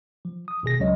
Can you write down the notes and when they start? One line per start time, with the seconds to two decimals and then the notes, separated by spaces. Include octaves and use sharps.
0.25 F3
0.48 D#6
0.63 G#1 B2 G#4 A#6
0.80 C#2 F#3 C#4 C#5 D#5